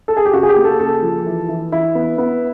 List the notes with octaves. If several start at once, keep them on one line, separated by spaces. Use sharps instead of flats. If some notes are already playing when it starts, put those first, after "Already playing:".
A4
G#4
G4
C#3 F#4
G#4
G4
A#3
A4
C#3 A4
F3
E3
E3
E3 E4
B3
B3